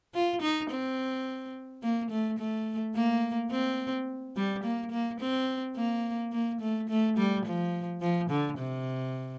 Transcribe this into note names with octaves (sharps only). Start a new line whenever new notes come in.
F4
D#4
C4
A#3
A3
A3
A#3
C4
G3
A#3
A#3
C4
A#3
A#3
A3
A3
G3
F3
F3
D3
C3